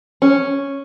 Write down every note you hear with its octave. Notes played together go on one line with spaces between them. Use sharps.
C#4